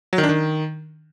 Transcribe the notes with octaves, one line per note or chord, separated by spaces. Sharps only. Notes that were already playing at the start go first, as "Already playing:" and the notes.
F#3
D#3
D4
D#3